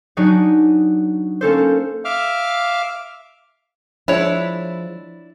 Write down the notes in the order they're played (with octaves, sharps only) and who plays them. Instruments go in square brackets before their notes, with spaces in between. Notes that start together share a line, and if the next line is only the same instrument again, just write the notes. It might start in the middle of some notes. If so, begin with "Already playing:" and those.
[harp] F#3 D4 D#4 F#4 G#4
A#3 C#4 A4 C5
[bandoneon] E5 F5 D6 F6
[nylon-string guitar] F3 G#3 [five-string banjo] D4 C#5 [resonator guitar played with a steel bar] E4